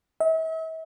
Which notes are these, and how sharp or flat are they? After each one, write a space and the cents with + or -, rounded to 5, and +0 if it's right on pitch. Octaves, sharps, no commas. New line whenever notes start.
E5 -40